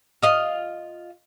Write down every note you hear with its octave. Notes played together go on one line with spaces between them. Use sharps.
F4 D#5 F5